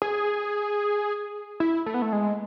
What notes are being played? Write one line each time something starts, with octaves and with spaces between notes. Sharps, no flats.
G#4
E4
A3
B3
A3
G#3